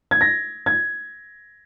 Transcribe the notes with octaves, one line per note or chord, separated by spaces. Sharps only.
G#6
A#6
G#6